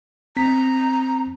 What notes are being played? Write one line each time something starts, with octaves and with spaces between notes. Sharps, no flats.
C4 A#5 B6